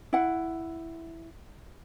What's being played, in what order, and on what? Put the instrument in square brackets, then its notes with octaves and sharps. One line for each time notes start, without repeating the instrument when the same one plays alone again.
[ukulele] E4 F#5